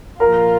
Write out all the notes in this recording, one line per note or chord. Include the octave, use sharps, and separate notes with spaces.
A#2 F3 A#3 F4 A#4